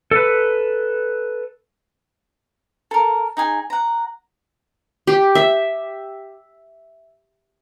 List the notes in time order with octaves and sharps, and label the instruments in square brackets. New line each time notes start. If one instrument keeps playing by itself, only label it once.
[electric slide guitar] A4 B4
[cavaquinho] A4 A#4
D#4 G#4 G#5
F#5 A#5
[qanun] G4
E5